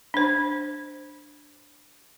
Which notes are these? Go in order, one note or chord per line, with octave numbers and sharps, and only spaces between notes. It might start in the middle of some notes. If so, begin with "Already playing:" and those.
D4 C5